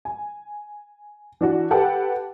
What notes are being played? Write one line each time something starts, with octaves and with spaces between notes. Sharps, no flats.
G#5
E3 D4 F#4
G4 A4 B4 F#5 G5 A5